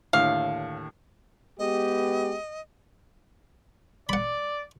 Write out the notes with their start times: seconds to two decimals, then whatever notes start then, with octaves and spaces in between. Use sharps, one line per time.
0.13 D#2 A2 D3 F5
1.59 G#3 B3 G4 D#5
4.09 D5 F#5 B5